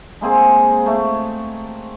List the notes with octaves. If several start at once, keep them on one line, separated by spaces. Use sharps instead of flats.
G#3 A#3 C4 G#4
A3